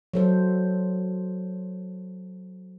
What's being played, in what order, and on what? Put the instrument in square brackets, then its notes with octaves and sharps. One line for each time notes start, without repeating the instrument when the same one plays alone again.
[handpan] F#3 A4 C5